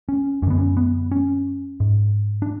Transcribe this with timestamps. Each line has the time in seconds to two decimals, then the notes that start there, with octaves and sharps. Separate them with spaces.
0.09 C#4
0.42 F#2 C#4
0.47 D3 B3
0.58 C#4
0.77 B3
1.12 C#4
1.80 G#2
2.42 D4